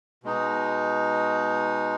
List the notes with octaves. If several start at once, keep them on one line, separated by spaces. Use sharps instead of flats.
B2 G#3 D#4